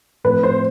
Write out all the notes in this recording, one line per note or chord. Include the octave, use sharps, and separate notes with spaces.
A2 F3 C4 B4
C5